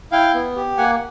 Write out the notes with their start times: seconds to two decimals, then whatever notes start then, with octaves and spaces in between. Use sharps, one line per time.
0.12 E4 F5 G5
0.34 B3
0.56 G4
0.78 A#3 F#5 G#5